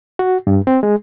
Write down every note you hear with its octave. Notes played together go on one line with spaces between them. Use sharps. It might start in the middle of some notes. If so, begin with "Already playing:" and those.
F#4
G2
C4
G#3